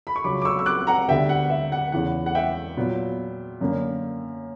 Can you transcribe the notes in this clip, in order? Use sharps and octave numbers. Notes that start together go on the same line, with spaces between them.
B5
C#6
C#2 C#3 F#3 B5 D6
D6
C#6 E6
E6
D6 F#6
F#5 A#5
D2 D3 G3 B3 E5 G5
F#5
E5
F#5
E2 C#3 E3 B3 F#5
F#5
E5 G5
A#2 F#3 B3
F#2 D3 A#3